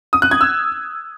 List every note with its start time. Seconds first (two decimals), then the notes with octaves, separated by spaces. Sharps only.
0.13 D#6
0.22 F#6
0.31 G#6
0.41 E6